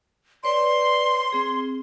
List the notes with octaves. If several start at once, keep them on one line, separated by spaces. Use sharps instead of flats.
B4 C#5 D5 C6
C4 G#4